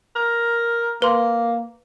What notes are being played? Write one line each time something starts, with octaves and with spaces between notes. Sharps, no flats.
A#4
A#3 B4 C6